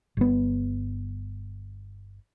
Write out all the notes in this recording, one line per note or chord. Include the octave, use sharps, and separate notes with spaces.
G1 B3